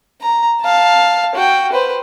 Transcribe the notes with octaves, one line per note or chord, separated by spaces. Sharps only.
A#5
F5 A5
F#4 G5
B4 C5